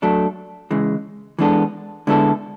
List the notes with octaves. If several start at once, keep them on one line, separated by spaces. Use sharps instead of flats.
F#3 A3 D4 A4
C#3 E3 G#3
E3 G#3 B3 D4 A4
D3 G#3 B3 E4 A4